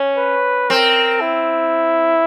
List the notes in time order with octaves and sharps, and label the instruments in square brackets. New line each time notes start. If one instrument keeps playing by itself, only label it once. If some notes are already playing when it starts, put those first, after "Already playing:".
Already playing: [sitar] C#4
[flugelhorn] B4
[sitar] C4 [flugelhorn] A#4
[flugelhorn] E4